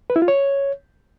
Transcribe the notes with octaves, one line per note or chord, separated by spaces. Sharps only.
B4
E4
F4
C#5